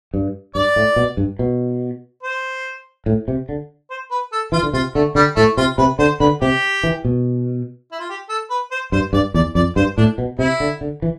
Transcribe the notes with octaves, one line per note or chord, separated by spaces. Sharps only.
G2
G2 D5
A2
B2
G2
B2
C5
A2
C3
D3
C5
B4
A4
E3 F4
D3
C3 F4
D3 A3
D3 G3
A2 A3
C3 F4
C3 B4
D3 C5
D3 B4
C3 G4
E3
B2
E4
F4
G4
A4
B4
C5
G2 C5
G2 D5
E2 D5
F2 D5
G2 C5
A2 D4
B2
C3 E4
D3
D3
E3